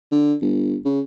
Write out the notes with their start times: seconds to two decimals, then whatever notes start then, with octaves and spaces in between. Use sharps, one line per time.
0.12 D3
0.42 G1
0.85 C#3